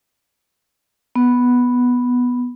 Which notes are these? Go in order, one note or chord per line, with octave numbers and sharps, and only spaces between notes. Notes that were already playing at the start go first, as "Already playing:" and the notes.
B3